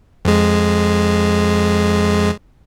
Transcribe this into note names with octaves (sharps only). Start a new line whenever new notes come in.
F2 G#3